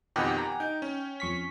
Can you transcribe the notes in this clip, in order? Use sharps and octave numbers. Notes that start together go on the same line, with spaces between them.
F2 B2 D#3 G4 F#5 G#5
A#5
D#4 G5
C#4
F2 C#6 B6